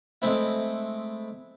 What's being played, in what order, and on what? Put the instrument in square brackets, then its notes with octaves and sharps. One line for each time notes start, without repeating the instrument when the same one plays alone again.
[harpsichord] G#3 A3 C4 E4